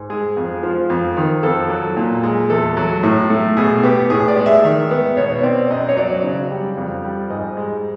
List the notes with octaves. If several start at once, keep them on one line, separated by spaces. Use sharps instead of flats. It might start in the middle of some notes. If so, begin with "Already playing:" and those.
Already playing: G#2
G#3 G#4
F2
F3
F2
D#3
F2 A4
F#3
A#2
G#3
E2 A4
F#3
A2
A3
B2 G#4
B3 G4
A2 G#4
D5
G#3
E5
D#3
B3
B2 C#5
C4 D5
F#2 D#5
C#5
F#3 D5
C#3
G3
F2
G3
G#2 D#5
G#3